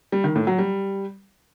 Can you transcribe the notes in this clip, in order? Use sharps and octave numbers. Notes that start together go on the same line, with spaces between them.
G3
D#3
A2
F#3
G3